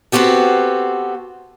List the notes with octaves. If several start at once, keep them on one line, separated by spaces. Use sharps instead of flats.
B3 C4 F#4 G4 A4